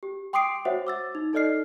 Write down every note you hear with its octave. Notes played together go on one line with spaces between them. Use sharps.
G4
G5 C6 D6 D#6 C7 D7
F#4 C5 C#5 E5 F#5
D6 E6 A6
D#4
D#4 A4 D5 D#5 F6 C7